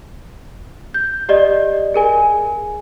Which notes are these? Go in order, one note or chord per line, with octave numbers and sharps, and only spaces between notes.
G6
G4 D5 D#5
G#4 A#4 G#5